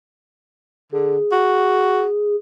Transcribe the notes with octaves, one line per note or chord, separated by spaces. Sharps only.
D3 G#4
F#4